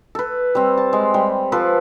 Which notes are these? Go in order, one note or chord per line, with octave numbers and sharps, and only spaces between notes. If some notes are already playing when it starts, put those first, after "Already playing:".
A4 B4
G3 C4
A5
G#3
G3
F3 A4 B4